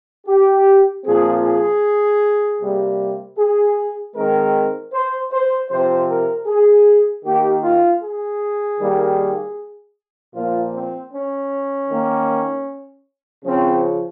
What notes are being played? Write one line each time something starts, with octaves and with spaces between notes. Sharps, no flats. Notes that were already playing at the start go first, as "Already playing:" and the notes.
G4
A#2 F3 C4 G#4
G#4
C3 G3 A#3
G#4
D#3 G#3 C4 A#4
C5
C5
C3 F3 C4 C5
A#4
G#4
D#3 A#3 G4
F4
G#4
D#3 G3 A#3
A#2 F3 A#3 F4
C4
C#4
D#3 A#3
C#3 F3 C4 C#4